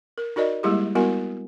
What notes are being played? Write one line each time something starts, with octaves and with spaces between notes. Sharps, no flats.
A#4
D#4 F#4 A#4 D5 D#5
G3 G#3 A#3 E4 G4 G#4
G3 B3 E4 F#4 A#4 G#5